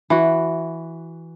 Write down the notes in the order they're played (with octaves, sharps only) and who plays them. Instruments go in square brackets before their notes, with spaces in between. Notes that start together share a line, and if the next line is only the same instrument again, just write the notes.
[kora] E3 F#4